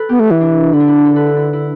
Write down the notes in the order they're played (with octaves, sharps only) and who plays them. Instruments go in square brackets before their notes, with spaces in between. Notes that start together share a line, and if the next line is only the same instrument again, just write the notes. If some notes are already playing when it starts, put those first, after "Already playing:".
Already playing: [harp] A4 B4
[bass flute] B3 [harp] G4
[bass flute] A3
E3
[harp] D4
[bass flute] D3 [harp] E4
[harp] D4
E4
A4
B4
E4
E4
E4